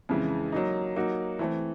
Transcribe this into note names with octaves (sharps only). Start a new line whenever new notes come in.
F2 C#3 E3 G#3
F#3 A#3 D#4
F#3 A#3 D#4 F#4
E3 A3 C4